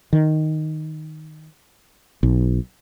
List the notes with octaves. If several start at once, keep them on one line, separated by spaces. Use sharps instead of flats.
D#3
B1